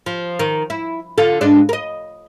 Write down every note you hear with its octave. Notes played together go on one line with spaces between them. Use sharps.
F3
D#3
E4
D3 F4 A4
G#2 G#3 D4
A#4 D#5